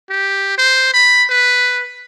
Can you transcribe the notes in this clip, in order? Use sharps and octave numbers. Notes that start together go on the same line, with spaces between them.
G4
C5
B5
B4